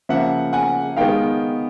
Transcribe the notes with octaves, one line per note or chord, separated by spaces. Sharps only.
C#3 F3 A#3 E5 F#5
F#5 G#5
D#3 G#3 B3 F5 G5